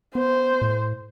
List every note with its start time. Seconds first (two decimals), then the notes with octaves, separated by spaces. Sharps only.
0.15 B3 C5
0.62 A2